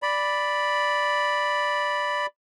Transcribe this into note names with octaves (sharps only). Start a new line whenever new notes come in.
D5 B5